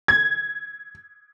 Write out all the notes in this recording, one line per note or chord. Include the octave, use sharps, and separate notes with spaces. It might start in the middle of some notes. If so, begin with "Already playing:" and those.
G#6